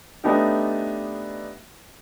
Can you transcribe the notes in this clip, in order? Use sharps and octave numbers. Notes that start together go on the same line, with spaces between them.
A3 B3 D4 D#4 G4